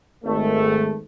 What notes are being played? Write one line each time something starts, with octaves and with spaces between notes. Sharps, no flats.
G#1 A3